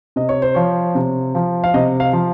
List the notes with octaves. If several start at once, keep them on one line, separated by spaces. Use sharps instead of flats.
C3 D#5
C#5
C5
F3 C#5
C3
F3
F5
C3 D#5
F5
F3